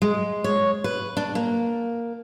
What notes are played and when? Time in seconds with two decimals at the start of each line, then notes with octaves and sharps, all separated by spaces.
0.02 G#3
0.44 C#5
0.84 B4
1.17 D4
1.35 A#3